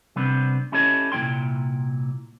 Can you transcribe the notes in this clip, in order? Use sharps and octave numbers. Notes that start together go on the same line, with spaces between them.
C3 G3 B3 C4 D4 B4
C#4 E4 G4 A4 C#5 D#5
C2 A#2 F#3 E4 G5 C6